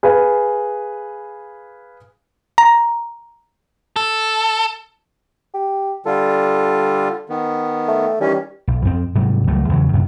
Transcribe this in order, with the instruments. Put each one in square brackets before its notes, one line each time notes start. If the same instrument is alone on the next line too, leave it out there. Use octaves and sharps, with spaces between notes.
[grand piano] G#4 B4 F5 G#5
[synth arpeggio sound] A#5
[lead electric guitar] A4
[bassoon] G4
[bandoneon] D3 G3 F4 [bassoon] A4
[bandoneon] D#3 B3
[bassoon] A3
[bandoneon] D#3 E3 C#4 [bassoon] G3
[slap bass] B1
F2 C4
G#2 C3 F#3 G3
C#2 F#3 G3 A3
E2 C#3 E3 F#3
F#2 C3